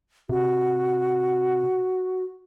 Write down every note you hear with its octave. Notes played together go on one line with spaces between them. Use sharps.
C3 F#4